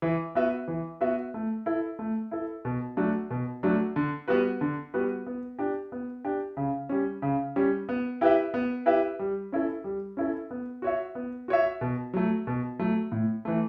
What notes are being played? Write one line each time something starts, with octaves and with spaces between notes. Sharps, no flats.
E3
B3 F#4 B4 E5
E3
B3 F#4 B4 E5
A3
E4 A4
A3
E4 A4
B2
F#3 A3 D4 F#4
B2
F#3 A3 D4 F#4
D3
G3 B3 F#4 B4
D3
G3 B3 F#4 B4
B3
D4 G4
B3
D4 G4
C#3
G3 C#4
C#3
G3 C#4
B3
E4 G4 B4 E5
B3
E4 G4 B4 E5
G3
C#4 E4 A4
G3
C#4 E4 A4
B3
F#4 C#5 E5
B3
F#4 C#5 E5
B2
F#3 A3
B2
F#3 A3
A2
E3 A3